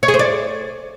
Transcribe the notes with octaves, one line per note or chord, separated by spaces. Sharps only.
C#5
G#4
C5
D5